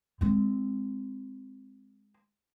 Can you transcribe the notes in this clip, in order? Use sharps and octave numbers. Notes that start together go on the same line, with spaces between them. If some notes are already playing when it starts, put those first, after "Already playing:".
G#3 C4